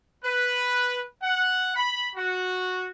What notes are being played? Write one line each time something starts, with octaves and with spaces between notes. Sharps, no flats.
B4
F#5
B5
F#4